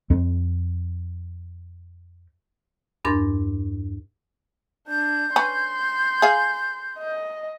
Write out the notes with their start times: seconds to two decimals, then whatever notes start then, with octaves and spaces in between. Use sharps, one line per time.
0.10 F2 C4
3.05 E2 G2 D4 A#4 C6 A6
4.88 D4 G6
5.36 C#4 B4 C6
6.22 G#4 F5
6.98 D#5